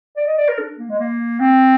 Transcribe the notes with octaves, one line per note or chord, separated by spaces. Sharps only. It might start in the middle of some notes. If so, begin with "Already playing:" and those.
D5
D#5
D5
A#4
D4
A#3
G#3
A#3
C4